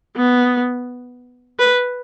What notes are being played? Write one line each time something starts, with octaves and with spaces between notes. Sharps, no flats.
B3
B4